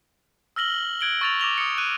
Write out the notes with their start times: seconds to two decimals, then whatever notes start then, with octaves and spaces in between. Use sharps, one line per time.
0.56 E6 F6 A#6 F#7 G7
1.01 F#6 G#6 D7 F#7 G7
1.21 C#6 A6 F7
1.40 D6 A#6 F7 G7
1.58 D#6 C#7
1.78 F#6 D#7